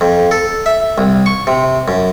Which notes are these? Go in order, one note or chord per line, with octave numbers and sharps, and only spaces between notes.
F2
A4
E5
C2
C#6
C3
F#2